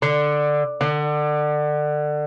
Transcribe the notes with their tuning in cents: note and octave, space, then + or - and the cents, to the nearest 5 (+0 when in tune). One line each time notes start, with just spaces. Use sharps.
D3 +10
D3 +25